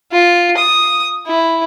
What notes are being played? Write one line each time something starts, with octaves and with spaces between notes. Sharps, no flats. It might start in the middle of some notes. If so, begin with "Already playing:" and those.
F4
D#6
E4